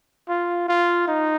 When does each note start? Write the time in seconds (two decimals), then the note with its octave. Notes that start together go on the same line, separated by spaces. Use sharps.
0.29 F4
0.69 F4
1.08 D#4